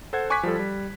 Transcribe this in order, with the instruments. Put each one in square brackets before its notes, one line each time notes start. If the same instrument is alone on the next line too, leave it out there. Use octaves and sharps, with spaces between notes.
[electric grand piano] A4 C5 F#5 G#6
G#5 C#6 D6 F#6 G#6 B6
F3 G3 A4
G3